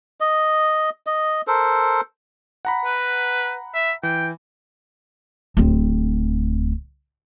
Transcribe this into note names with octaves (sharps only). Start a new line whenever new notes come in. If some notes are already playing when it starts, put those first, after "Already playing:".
D#5
D#5
A4 A#4 C5
F#5 A#5 B5
B4
E5
E3 G5
D1 C4